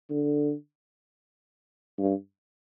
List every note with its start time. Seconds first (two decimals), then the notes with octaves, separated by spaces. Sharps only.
0.10 D3
1.98 G2